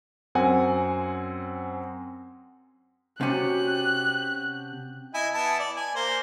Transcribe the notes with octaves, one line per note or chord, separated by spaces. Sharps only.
F#2 C4 F#5 G#5
C3 C#4 F#4 G4 A5 F#6
E4 D#5 G#5
B3 E4 A5
D5
G#5
A#3 C5